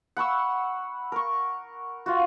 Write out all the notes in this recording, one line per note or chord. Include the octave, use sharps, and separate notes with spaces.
F#5 B5 C#6 E6
A#4 C#6
F4 F#4